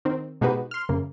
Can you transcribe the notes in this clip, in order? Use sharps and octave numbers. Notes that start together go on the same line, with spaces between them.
D#3 C4
B2 G#3 D#4 F#4 G4 B4
C6 F6
F#2 C#3 A#3